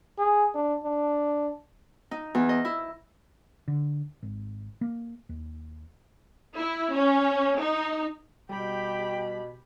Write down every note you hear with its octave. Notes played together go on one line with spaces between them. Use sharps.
G#4
D4
D4
D#4
E2
D#5
E4
D3
G#1
A#3
D#2
E4
C#4
D#4
B2 G3 G4 G5 B5